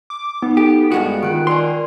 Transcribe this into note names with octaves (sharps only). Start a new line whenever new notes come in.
D6
B3 D#4
G4 A4
G2 G#3 F#4
D#3 F4 F#6 D7
B4 D5 G#5 C6